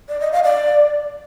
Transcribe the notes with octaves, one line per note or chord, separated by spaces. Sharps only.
D5
D#5
F5
D5